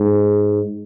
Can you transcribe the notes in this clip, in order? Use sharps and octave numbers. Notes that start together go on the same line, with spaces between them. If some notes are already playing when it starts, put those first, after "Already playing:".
Already playing: G#2